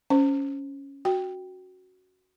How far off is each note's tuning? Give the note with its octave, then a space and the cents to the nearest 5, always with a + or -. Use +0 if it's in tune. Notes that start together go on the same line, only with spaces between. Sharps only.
C#4 +0 C5 +0
F#4 +0 G5 +0